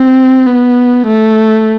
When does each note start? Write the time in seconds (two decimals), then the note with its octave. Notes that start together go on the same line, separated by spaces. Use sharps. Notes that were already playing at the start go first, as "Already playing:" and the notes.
Already playing: C4
0.46 B3
1.07 A3